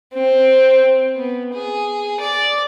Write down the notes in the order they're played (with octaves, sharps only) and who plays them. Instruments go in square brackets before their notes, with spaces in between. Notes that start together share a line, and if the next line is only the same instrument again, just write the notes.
[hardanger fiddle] C4
B3
G#4
D5